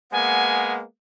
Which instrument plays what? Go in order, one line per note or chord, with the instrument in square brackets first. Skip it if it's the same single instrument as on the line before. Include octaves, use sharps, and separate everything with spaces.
[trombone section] G#3 A#3 B3 [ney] F#5 [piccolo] G#5